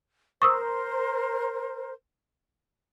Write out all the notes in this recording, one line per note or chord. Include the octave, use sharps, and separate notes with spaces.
A#4 C5 C#6 D#6 E6